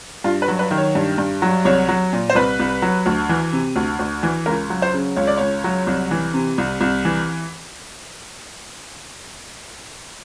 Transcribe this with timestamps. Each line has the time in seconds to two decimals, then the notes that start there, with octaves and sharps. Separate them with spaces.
0.24 G2 F4
0.42 B4
0.48 F#3
0.59 B4
0.71 D#3
0.78 C#5
0.95 G2
1.18 G2
1.42 F#3
1.65 C2 C#5
1.89 F#3
2.13 A#2
2.30 C5
2.35 C2 B4
2.60 C2
2.82 F#3
3.06 D2
3.29 E3
3.53 C3
3.76 D2
3.99 D2
4.23 E3
4.46 C#2 A#4
4.70 F#3
4.82 C5
4.94 C#3
5.16 C#2 C#5
5.27 D5
5.37 C#2 C#5
5.64 F#3
5.87 C2
6.11 E3
6.34 C3
6.58 C2
6.81 C2
7.05 E3